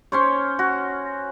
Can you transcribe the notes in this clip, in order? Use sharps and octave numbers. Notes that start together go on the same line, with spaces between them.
C#4 C5 C#5
F#4